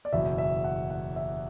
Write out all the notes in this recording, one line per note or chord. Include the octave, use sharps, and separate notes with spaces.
D5
F#1 E2 B2 E5
E5
F#5
F#5
E5